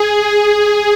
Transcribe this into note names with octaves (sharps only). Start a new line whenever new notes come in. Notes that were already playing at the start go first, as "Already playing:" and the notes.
Already playing: G#4
G#4